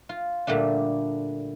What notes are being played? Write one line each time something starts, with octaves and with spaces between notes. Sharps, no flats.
F4
A#2 D3 G3 A3 D4